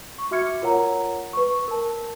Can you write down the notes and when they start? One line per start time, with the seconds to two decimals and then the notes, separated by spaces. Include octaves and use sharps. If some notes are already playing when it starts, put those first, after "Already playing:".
0.19 C#6
0.31 F#4 E5 D6 F6 G#6 C#7
0.62 F4 A#4 C#5 F#5 A#5
1.33 B4 C#6
1.68 A#4 A5